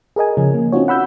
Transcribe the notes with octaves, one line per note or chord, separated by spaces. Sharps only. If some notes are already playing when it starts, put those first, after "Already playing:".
G#4 A#4 D#5 G#5
C#3 F3 C#4
A#3
C4 C#4 D#4 F4 F#4 C#5
F#5 B5 E6 G6